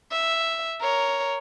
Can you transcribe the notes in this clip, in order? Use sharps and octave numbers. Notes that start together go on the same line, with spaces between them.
E5
A#4 C#5